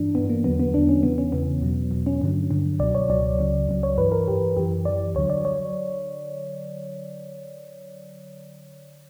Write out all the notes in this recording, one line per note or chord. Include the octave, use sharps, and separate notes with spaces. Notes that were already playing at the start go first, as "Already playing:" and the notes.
Already playing: G2 E3 D4
G2 E3 B3
A#3
E2 D3 F#3 B3
B3
E2 D3 F#3 D4
C#4
E2 C#3 E3 B3
C#4
E2 C#3 E3 B3
E2 B2 F#3
E2 B2 F#3
C#4
G2 D3 F#3
G2 D3 F#3
C#2 B2 F#3 D5
C#5
C#2 B2 F#3 D5
C#2 C#3 F#3
C#2 C#3 F#3
C#5
G2 E3 B4
A#4
G2 E3 G4
F#2 E3 G4
F#2 E3 D5
D2 D3 F#3 C#5
D5
F#3 C#5